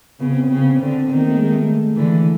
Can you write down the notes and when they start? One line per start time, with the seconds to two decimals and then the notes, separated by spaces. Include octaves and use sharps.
0.20 C#3 B3
0.30 C4
0.39 B3
0.49 C#3 C4
0.58 B3
0.78 D3 C4
1.08 D#3 B3
1.20 A#3
1.29 A3
1.37 G#3
1.51 A3
1.96 D3 E3